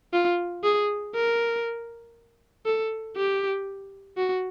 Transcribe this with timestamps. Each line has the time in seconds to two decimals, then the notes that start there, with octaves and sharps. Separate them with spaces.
0.13 F4
0.63 G#4
1.14 A#4
2.66 A4
3.16 G4
4.17 F#4